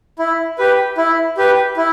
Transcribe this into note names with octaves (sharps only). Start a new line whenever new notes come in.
E4
G4 B4
E4
G4 B4
E4